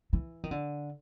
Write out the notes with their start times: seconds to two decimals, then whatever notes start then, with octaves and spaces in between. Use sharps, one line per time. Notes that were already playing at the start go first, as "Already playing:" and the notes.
0.13 E3
0.44 D#3
0.51 D3